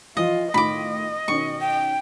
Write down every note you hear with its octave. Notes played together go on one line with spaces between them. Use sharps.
E3 F3 F4 D#5
A2 D#3 F4 D#5 B5 D6
B2 D#3 C#4 C#6
G5